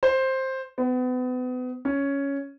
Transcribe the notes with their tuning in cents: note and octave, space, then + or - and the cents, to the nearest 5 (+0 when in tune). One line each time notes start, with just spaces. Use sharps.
C5 +10
B3 +35
C#4 +5